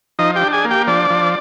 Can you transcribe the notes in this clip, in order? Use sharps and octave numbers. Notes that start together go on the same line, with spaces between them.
F3 D#4 D#5
G4 G5
D4
G#4 G#5
A#3
G4 G5
F3 D4 D5
F3